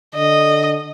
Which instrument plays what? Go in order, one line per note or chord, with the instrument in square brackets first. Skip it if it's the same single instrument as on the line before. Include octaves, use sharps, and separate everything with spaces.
[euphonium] D3 [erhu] D#5